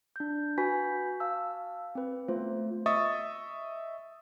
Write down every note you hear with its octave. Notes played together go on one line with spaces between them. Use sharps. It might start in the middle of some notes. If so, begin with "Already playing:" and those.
D4 G6
F#4 B4 G#5 B5 G6 B6
F5 A5 E6
C4 B4
A3 B3 F4 C5
D#5 E5 C#6 D#6 A6